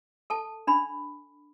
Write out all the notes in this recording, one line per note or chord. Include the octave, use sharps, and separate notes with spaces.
A4 A5
D4 B5